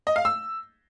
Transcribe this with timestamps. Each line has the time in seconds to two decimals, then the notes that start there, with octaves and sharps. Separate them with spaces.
0.07 D#5
0.16 F5
0.25 E6